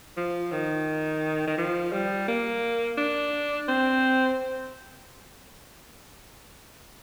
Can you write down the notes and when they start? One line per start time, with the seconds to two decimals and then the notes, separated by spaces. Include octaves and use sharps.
0.17 F3
0.52 D#3
1.47 D#3
1.58 F3
1.92 G3
2.28 A#3
2.98 D4
3.69 C4